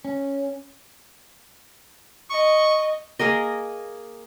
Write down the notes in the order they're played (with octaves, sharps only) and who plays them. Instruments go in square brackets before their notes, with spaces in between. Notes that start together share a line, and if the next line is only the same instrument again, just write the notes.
[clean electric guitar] C#4
[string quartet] D#5 [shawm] C#6
[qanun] A#3 G#4 A#4 D#5